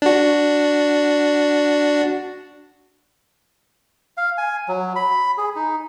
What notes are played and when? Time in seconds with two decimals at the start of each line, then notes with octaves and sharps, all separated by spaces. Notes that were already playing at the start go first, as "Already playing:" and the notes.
0.02 D4 F#4
4.17 F5
4.38 G#5
4.68 F#3
4.96 B5
5.38 G#4
5.56 D#4